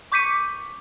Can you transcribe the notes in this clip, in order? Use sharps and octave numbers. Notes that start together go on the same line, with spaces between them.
C#6 D6 G6 B6 C#7 D#7